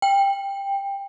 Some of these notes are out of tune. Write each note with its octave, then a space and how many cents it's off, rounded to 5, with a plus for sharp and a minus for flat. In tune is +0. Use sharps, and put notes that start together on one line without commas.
G5 +15